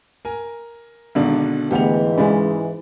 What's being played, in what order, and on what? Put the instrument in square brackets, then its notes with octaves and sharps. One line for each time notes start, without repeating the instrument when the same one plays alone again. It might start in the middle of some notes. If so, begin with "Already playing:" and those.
[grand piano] A#4 G#5
[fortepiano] G#1 [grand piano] B2 D3 D4
[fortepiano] D2 B3 F#5 [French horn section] G#2 E3 [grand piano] G4 F7
[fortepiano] C#3 G#3 [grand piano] D5 B5